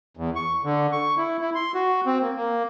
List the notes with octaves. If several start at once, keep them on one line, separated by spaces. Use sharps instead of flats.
E2
C#6
D3
C#6
E4
E4
C6
F#4
C4
A#3
A#3